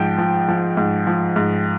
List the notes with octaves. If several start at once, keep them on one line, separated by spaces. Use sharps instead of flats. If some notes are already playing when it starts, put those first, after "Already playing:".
Already playing: G#2 F3 G5
F3
F3
G#2
F3
G#2